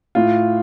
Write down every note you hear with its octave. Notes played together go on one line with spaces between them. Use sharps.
A2 F4